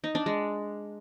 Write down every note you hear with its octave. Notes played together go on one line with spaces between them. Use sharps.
D#4
D4
G#3